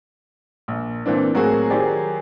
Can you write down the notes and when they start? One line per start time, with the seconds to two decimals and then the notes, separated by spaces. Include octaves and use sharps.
0.68 A#1
1.06 A#2 E3 C4 D4
1.34 A2 F#3 A#3 C4 F#4 G#4
1.70 D#3 F#3 G4 G#4 C5 D5